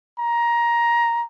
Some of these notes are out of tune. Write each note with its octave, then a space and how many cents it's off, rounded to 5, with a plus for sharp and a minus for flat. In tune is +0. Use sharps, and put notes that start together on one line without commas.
A#5 +15